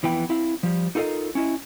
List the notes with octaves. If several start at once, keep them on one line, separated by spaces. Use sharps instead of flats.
F2 E3 B3 G5 B5
C4 E4 F5
F3 G3
D#4 F4 A4 A#4 D#5 F5
C#4 E4 D#5